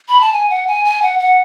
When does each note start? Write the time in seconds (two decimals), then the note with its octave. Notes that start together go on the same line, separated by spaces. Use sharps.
0.08 B5
0.21 A5
0.33 G#5
0.50 F#5
0.67 G#5
0.85 G#5
1.02 F#5
1.19 F#5